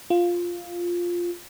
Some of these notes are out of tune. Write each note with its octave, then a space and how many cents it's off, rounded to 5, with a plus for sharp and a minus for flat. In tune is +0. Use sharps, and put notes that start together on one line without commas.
F4 +0